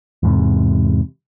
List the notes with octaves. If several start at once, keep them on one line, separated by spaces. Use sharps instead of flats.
E2 G#2 C3